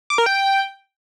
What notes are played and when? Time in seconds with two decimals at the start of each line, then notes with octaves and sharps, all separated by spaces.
0.10 D6
0.18 A#4
0.26 G5